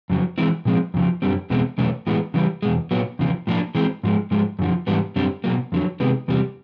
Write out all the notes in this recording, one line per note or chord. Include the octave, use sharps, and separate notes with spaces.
F2 C#3 F#3
E3 G#3 C4 E4
A#2 F3 G#3 C4
F2 C#3 F3
F#2 D3 G3 C4
E2 B2 G#3 C4
E2 B2 F#3 A3 C#4
A2 E3 G#3 B3
C#3 E3 G3
E2 B2 G#3
A#2 F#3 B3
E2 C#3 F3
A2 F3 A#3 D4
E3 G#3 C4
G#2 F3 G#3
G#2 F3 G#3
F#2 D3 F3
G#2 E3 G3 B3 D4
F#2 D3 G3 C4
B2 F#3 A#3
F2 D3 F#3
C3 D#3 G#3 B3
E2 C3 G3